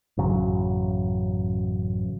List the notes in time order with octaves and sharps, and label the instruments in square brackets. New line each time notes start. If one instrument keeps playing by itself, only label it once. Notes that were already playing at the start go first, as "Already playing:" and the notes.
[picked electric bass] A1 F#2 C#3 F#3